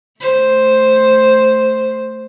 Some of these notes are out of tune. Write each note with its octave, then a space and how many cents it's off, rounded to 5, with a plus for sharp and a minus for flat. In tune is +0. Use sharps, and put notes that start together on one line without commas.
A3 +0 C5 +0